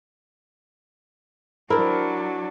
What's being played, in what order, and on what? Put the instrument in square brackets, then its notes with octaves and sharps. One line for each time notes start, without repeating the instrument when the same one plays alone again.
[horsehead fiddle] F#3 D4 [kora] E4 [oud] G4 C5 [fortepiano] A#4